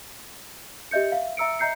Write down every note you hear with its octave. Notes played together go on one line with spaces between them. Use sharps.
G4 D#5 E5 G6 C#7
E5 F5
E5 A#5 E6 C#7 D7
D#5 E5 A#5 G6 C7 C#7